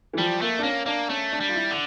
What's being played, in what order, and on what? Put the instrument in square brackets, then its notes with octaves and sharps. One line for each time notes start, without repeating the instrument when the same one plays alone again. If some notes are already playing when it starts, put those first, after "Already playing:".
[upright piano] E3
[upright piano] F3 [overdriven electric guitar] G3
[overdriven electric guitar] A3 [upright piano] A#3
[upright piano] D4
[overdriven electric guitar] A#3 [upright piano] C#4
[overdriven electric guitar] A#3 [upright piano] D4
[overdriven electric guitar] A3 [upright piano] C#4
[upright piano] D4
[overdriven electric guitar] G3
[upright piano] F4
E4
[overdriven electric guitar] D3